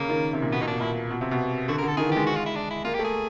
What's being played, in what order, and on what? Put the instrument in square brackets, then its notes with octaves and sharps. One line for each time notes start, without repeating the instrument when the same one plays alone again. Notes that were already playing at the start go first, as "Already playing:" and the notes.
Already playing: [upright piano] C#3 [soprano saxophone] A#3
[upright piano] D#3
C3
A#2
[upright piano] B2 [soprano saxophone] B3
[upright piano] A#2 [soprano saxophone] D#4
[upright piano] B2 [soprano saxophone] D4
[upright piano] A#2 [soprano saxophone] E4
[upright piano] B2
C3
B2
[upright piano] D3 [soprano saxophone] F#4
[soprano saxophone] A#4
[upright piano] D3
[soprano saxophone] A4
[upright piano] D#3 [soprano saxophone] G#4
[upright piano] E3
[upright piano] G#3 [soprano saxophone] G4
[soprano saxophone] F#4
F4
E4
D4
E4
[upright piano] A#3 [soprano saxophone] F4
[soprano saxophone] G4
[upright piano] A3
[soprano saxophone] G#4